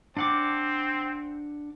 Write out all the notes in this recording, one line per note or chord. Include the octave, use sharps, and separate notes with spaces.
C4 D4 F#5 D6